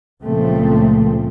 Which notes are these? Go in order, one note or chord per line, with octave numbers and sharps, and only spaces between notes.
C#2 A#2 C#3 F3 A3 C4